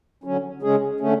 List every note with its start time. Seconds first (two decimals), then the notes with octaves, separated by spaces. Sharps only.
0.24 D3 F#3 C#4
0.62 C#3 G#3 C#4 G#4
1.00 D3 A3 C#4